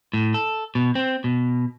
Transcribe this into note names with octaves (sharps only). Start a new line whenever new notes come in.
A2
A4
B2
C4
B2